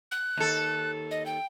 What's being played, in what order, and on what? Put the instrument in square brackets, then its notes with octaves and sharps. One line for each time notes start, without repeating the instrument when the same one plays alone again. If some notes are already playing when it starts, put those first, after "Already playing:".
[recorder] F#6
[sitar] D#2 A4
[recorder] D#5
G5